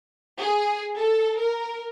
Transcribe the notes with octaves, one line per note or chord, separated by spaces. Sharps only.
G#4
A4
A#4